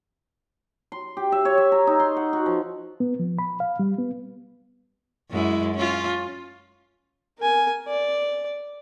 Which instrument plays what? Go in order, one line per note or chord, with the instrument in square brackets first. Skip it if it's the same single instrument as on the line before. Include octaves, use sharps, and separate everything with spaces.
[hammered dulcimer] C6
G4
E5
C#5
E5
A#5
D#4
C6
F#5
F#4
F3
[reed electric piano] B3
F3
B5
F5
G3
B3
[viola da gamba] F#2 G#3 E4
C#4 F4
[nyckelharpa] A#4 G#5
D5